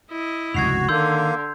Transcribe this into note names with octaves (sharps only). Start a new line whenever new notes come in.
E4 D#5
F1 C#2 G2 F#4 G#6 C7 F7
D3 D#3 A#3 C6 E6 G6